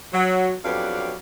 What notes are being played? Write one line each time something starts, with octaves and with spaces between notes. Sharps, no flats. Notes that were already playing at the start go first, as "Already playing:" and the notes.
F#3
F2 F#3 B3 D4 G4 F5